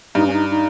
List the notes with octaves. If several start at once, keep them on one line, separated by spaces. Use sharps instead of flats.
G2 D#4
C#4
D#4
D#4